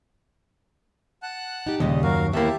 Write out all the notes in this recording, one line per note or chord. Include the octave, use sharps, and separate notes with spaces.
F#5 A5 F#6
D#4 G4
D#2 A#2 C#3 G3 D#5
F#2 F#4 A#4 F5
D#2 A#3 B3 E4 G4 E5 A5